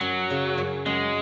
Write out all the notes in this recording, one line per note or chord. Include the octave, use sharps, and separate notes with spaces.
F#2 F#3
C#3
F#2
F#2 G#3